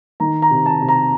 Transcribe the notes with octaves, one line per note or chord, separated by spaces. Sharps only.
D#3 A#5
A#5
C3
A5
C3
A#5